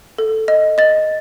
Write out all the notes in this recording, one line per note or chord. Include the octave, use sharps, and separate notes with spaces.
A4
D#5
D#5 A6